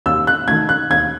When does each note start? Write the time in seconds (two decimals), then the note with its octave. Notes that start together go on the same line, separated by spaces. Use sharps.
0.06 D#2 E6
0.27 F#6
0.48 D#3 A3 G#6
0.69 F#6
0.90 D#2 G#6